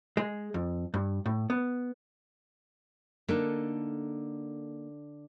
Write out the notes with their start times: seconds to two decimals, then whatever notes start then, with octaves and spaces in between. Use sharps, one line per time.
0.17 G#3
0.54 F2
0.94 G2
1.26 A2
1.50 B3
3.28 D3 A#3 D#4 A4